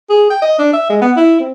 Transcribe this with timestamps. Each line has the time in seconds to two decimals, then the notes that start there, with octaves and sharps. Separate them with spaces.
0.09 G#4
0.30 G5
0.42 D#5
0.59 D4
0.73 E5
0.89 G#3
1.01 B3
1.17 E4
1.40 C4